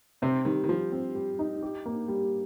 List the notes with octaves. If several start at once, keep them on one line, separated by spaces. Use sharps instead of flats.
C3 C4
D#3 G3
D#3
F3 G3
C4
G3
D#4
G4
A#3
G3